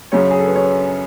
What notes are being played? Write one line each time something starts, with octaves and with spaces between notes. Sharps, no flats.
F#2 C#3 F#3 C#4 C#5
G#4
A4
B4
C#4 C#5